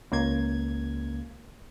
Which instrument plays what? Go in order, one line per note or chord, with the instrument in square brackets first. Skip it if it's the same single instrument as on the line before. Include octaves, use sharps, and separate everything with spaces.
[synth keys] C#2 A#3 G#6